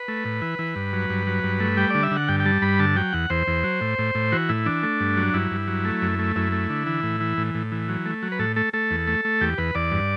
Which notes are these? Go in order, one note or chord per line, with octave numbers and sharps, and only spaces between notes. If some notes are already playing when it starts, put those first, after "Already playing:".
Already playing: B4
A3
A2
E3
E3
G2
F#3
G2
F#3
G2
A3
G3 G5
D3 D5
E5
D3 F#5
G2 G5
G5
G3 A5
G2 B5
D3 A5
F#3 G5
E2 F#5
E2 C5
E2
F#3
A2
A2
A2
E3 F#4
A2 E4
E3 D4
A3
G2
F#3
G2 E4
G2
F#3
A3
F#2
A3
F#2 E4
A3
D3
E3
A2
E3
A2
A2
E3
F#3
A3
F#3
B4
A2 A4
A3 A4
A3 A4
E2
A3
A3
E2 G4
E2 B4
E2 D5
G2